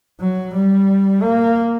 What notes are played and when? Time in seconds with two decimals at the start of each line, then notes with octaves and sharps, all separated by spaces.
0.21 F#3
0.54 G3
1.23 A#3